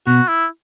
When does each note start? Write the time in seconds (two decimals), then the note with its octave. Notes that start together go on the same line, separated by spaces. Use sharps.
0.07 B2 F#4
0.28 E4